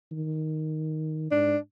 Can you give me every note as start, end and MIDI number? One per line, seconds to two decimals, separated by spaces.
0.12 1.29 51
1.31 1.56 44
1.31 1.57 62